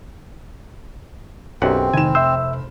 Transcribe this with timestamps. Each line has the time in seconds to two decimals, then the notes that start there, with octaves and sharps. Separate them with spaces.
1.62 B1 F#2 C4 G4 F#5
1.94 F1 D#3 D#4 G#5 E7
2.15 C5 E5 E6